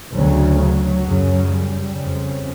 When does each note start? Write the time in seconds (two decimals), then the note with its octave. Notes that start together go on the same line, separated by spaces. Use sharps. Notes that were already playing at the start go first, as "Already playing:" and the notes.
0.13 D2 C#3 F#3
0.58 F#3
1.03 F#2 C#3
1.47 G3
1.92 F2 C#3